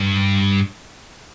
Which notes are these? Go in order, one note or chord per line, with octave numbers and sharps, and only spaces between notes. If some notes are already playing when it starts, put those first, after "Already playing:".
Already playing: G2